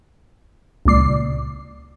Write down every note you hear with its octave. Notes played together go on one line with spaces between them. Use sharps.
C#2 A#2 D5 C7